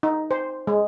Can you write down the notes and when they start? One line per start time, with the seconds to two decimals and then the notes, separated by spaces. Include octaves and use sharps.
0.03 D#4
0.31 C5
0.67 G#3